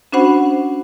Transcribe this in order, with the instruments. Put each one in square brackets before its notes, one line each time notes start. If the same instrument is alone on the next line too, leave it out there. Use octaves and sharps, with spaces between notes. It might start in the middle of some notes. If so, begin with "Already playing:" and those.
[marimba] C#4 D4 F#4 C5 F#5 B5